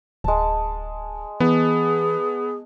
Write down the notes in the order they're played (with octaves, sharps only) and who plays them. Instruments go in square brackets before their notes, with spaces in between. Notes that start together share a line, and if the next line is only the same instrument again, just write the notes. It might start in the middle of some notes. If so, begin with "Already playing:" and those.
[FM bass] D1 [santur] G#3 A5
[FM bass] E3 [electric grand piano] B3 [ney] G#4